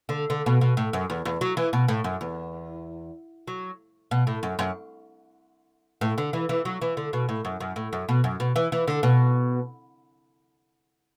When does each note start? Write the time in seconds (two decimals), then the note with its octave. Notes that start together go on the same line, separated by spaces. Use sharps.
0.09 D3
0.30 D3
0.46 B2
0.61 B2
0.77 A2
0.93 F#2
1.10 E2
1.25 E2
1.41 F#3
1.57 E3
1.73 B2
1.88 A2
2.04 F#2
2.21 E2
3.48 F#3
4.11 B2
4.27 A2
4.43 F#2
4.59 F#2
6.01 A2
6.18 D3
6.33 E3
6.49 E3
6.65 F#3
6.82 E3
6.97 D3
7.13 B2
7.29 A2
7.45 F#2
7.60 F#2
7.76 A2
7.93 F#2
8.09 B2
8.24 F#2
8.40 B2
8.56 E3
8.72 E3
8.88 D3
9.03 B2